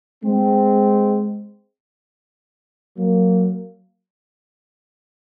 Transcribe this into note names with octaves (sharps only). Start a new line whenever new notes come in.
G#3 C4
F#3 A#3